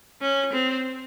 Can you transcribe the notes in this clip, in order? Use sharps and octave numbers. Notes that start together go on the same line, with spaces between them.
C#4
C4